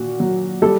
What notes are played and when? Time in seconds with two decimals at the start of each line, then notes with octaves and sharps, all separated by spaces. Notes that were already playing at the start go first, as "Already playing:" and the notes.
Already playing: A#2 F#4
0.20 F#3
0.62 G3 A4